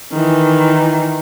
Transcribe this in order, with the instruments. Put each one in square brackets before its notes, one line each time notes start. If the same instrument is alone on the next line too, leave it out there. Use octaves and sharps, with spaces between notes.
[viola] D#3 E3